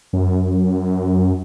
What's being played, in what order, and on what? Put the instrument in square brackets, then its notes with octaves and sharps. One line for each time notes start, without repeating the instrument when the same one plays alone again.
[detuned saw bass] F#2